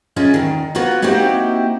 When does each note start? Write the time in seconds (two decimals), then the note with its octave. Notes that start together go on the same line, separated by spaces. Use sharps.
0.16 C#4 E4 F4 G#4 D#5
0.34 E2 D#3
0.75 A#3 B3 F4 F#4 B4
1.02 A#3 C4 D#4 E4 F#4 G4